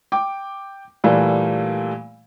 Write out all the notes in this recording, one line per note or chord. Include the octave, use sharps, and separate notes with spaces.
G5 D6
A#2 E3 G3 A3 A#3